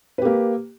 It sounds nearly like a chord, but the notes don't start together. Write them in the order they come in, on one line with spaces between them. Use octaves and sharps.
B4 G4 A#3